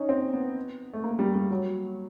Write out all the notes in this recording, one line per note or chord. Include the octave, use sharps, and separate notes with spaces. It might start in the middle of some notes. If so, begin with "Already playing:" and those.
Already playing: C#4 D#4
C4
B3
A3
A#3
G3
G3
F#3